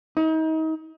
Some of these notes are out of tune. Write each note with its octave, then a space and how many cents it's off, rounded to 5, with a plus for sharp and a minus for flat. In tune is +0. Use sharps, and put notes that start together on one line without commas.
D#4 +35